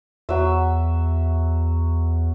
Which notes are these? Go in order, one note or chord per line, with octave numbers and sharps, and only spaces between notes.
E2 F#3 E5